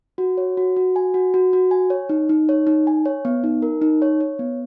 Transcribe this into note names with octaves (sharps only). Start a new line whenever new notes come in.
F#4
C#5
F#4
F#4
G#5
F#4
F#4
F#4
G#5
C#5
D#4
D#4
C#5
D#4
G#5
C#5
B3
D#4
A#4
D#4
C#5
C#5
B3